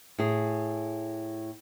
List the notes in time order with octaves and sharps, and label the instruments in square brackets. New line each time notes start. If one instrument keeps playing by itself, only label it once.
[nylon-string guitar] A2 G#4